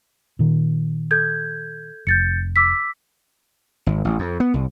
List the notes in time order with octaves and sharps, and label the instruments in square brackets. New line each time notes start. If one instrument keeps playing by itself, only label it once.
[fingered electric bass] A#2 D#3
[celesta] A4 G6 G#6
[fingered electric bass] F1 [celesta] G6 A6 C#7
[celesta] D6 E6 B6
[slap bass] G#1
A1
F2
B3
C2